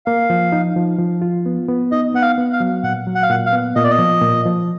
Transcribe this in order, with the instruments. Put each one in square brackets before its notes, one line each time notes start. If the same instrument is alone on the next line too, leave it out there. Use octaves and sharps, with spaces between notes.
[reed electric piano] A#3 [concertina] F5
[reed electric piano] F3
D#4
F3
F3
F4
B3
B3
[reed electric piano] D#4 [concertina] D#5
[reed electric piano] B3 [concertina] F#5
[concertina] F5
[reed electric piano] B3
[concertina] F5
[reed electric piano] F#3
[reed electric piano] A#2 [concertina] F#5
[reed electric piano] F#3
[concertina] F#5
F5
[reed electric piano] A#2 [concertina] F#5
[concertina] F5
[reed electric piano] B3
[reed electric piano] A#2 [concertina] D#5
[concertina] D5
D#5
[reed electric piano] F3
A#2
F3